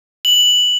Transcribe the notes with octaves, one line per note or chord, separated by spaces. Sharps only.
F#7